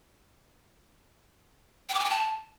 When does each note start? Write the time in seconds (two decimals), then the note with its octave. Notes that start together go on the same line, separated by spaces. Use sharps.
1.89 G5
1.94 D6
1.99 G#5
2.05 G5
2.10 A5